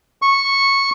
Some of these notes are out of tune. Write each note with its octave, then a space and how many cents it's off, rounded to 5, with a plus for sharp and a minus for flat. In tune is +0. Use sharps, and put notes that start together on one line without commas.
C#6 -10